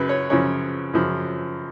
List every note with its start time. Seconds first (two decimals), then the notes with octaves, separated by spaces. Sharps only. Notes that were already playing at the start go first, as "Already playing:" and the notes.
Already playing: F#2 C#3 B4
0.09 C#5
0.30 F#2 C#3 F3 C#5
0.94 F#2 C#3 F3